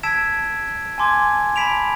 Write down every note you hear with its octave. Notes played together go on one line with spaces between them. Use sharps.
A5 E6 G#6 B6 D7 E7
G#5 A5 C6 D6 G#6
A5 B5 B6 D7 F7